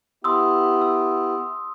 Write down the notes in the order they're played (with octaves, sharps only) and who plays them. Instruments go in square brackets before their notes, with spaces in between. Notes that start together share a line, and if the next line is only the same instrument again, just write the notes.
[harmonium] B3 E4 G4 [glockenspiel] C6 D#6 E6
[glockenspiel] E6